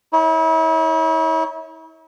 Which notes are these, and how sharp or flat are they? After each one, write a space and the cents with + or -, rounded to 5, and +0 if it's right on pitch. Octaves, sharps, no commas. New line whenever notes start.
E4 -40 C#5 +0